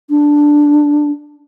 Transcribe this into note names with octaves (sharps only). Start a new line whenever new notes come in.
D4